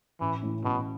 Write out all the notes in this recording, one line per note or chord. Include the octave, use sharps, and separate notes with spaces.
A1 E3
A2 E3 C#4
A1 B2